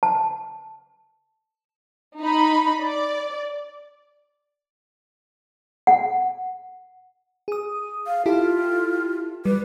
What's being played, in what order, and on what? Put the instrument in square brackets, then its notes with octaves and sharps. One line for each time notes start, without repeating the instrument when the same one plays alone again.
[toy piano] A5
[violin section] D#4 B5
D5
[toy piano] F#5
[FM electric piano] G#4 D#6
[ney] F5
[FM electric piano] E4 G4 A4 [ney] F4
[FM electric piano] G3 [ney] B4